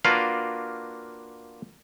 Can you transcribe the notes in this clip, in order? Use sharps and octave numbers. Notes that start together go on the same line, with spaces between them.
A#3 D4 F4 F#4 B4 F5